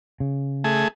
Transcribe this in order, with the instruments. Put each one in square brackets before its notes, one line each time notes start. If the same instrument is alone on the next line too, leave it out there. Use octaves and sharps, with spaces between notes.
[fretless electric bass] C#3
[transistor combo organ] A3 G#4